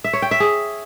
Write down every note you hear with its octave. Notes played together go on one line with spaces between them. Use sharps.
E5
C#5
G5
E5
G#4